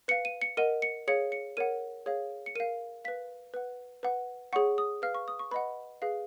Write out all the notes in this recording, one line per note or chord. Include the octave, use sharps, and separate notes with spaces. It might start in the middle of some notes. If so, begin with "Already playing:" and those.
B4 F5 C#7
D#7
C#7
A#4 D#5 F#5 D#7
C#7
G#4 C#5 F5 C#7
C#7
A#4 C#5 F#5 D#7
G#4 C#5 F5
C#7
A#4 F5 D#7
B4 F5 B6
B4 F#5
B4 F#5
G#4 C#5 F#5 C#6
D#6
B4 F5 F6
C#6
D#6
C#6
B4 D#5 F#5 B5
G#4 B4 F5